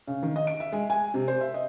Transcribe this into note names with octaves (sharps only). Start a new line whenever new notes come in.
C#3
D#3
D#5
D7
E5
G#3
G#5
C3
C5
E5
D#5